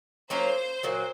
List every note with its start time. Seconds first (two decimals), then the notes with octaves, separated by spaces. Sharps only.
0.30 F#3 A#3 C#4 F4 C5
0.83 A#2 F#3 A#3